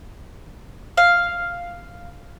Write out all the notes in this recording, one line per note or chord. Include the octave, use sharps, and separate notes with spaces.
F5